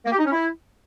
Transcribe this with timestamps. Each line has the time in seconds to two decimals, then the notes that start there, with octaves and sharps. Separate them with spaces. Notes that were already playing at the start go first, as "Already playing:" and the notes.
0.05 A#3
0.12 G4
0.19 D#4
0.25 C#4
0.32 E4